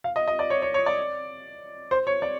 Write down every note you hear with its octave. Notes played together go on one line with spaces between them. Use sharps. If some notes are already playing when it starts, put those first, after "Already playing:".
F5
D#5
D#5
D5
C#5
C#5
C#5
D5
C5
C#5
D5